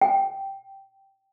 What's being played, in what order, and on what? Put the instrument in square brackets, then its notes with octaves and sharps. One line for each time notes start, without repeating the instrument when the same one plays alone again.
[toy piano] G5